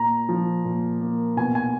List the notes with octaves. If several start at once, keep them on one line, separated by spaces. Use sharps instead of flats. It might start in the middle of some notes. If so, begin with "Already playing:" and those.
Already playing: A#2 A#5
F3
A#2
A#3
B2 G#5
G#5